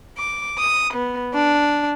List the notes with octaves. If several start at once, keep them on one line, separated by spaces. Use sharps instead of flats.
D6
D#6
B3
D4